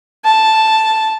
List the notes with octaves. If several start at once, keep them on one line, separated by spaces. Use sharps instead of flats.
A5